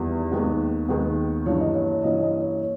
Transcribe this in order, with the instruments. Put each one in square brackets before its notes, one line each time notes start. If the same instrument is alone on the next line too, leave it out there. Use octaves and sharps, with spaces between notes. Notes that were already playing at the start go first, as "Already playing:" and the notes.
Already playing: [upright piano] E2 D#3 G3 B3
D#2 D#3 G#3 B3
D#2 D#3 G#3 B3
G2 E3 A#3 C#4 C#5
D#5
C#5
C#5
G2 E3 A#3 C#4 D#5
D#5
C#5
C#5